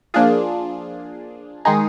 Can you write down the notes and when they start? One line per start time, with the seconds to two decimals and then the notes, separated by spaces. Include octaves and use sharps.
0.14 F3 A#3 D4 F4 G#4
1.65 D#3 G#3 D#4 G#4